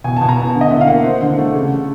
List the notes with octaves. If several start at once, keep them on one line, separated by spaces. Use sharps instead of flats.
B2 G#5
B2 A5
A#5
B3 A5
D3
D#5
D3 E5
F5
A#3 F#5
C4
D3
A3
C#3
C#3